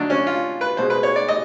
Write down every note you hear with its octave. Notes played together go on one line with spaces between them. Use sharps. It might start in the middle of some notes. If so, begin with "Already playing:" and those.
Already playing: D3 F#3 A3 D4 D#4
C#4
F4
B4
B2 G#3 C5
B4
C#5
D5
D#5